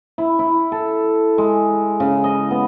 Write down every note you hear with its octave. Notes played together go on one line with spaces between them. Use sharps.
E4
E4
A4
G#3
C#3
D#5
B3